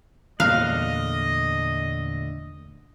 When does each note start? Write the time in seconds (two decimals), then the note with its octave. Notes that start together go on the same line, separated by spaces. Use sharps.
0.40 E2 A#2 D3 A3 D#5 F5 F#6